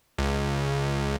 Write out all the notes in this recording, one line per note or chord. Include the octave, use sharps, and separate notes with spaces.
C#2